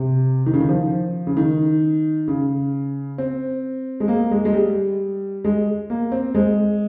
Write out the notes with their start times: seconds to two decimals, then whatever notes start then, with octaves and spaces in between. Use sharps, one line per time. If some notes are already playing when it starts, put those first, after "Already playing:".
Already playing: C3
0.46 D#3
0.54 C#3
0.60 D#3
0.69 F3
1.27 C#3
1.37 D#3
2.28 C#3
3.18 C4
4.00 G#3
4.08 A#3
4.31 G#3
4.45 G#3
4.54 G3
5.45 G#3
5.90 A#3
6.12 C4
6.35 G#3